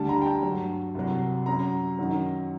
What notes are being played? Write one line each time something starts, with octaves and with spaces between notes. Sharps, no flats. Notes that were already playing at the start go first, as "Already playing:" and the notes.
Already playing: D2 D3 G3 A5
A#5
G5
A5
G2 F#3
C2 C3 F#3
F#2 F#3 A#5
F#2 D#3 F#3